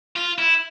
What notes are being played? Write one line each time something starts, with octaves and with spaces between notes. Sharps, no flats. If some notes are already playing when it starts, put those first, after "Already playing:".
F4
E4